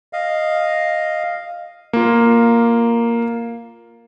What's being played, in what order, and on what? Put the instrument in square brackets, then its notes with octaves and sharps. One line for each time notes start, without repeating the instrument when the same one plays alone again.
[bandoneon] D#5 F5
[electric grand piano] A#3 F4